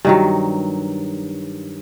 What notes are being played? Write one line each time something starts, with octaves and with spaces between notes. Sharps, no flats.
G2 D#3 F#3